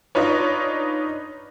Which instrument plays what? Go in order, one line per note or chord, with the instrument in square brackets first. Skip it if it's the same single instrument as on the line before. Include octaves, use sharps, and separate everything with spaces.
[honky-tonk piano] D4 D#4 F4 B4 C#5